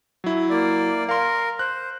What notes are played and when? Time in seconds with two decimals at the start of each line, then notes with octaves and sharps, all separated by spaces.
0.24 F#3 E4
0.50 A#3 D5
1.09 A#4 F5 C6
1.59 C5 F#6